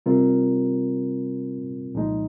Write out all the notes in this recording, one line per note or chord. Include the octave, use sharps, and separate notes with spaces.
C3 G3 C4 F4 A#4
C2 A#2 F3 G#3 D#4